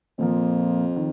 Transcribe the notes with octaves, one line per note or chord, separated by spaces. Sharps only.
F2 A#2 F3 A#3
D#3